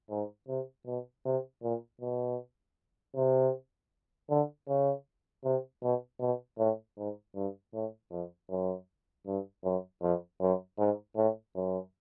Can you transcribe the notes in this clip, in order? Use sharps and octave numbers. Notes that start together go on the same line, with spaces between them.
G#2
C3
B2
C3
A#2
B2
C3
D3
C#3
C3
B2
B2
A2
G#2
G2
A2
F2
F#2
G2
F#2
F2
F#2
G#2
A2
F#2